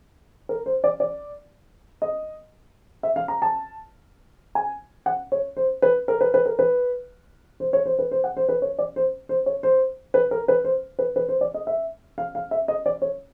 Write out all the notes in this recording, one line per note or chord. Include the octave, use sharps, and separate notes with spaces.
A#4
C5
D5
D5
D#5
E5
F5
A#5
A5
G#5
F#5
C#5
C5
B4
A#4
B4
B4
A#4
B4
C5
C#5
C5
B4
C5
F#5
C5
B4
C#5
D5
C5
C5
C#5
C5
B4
A#4
B4
C5
B4
B4
C5
D5
D#5
E5
F5
F5
E5
D#5
D5
C#5